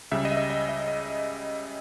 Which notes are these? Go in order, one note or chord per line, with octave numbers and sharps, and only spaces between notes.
C#2 C#3 G3 E5
D#5
E5
D#5
D#5
E5
D#5